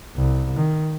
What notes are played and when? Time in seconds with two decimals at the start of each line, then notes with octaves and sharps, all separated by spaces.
0.17 C2
0.56 D#3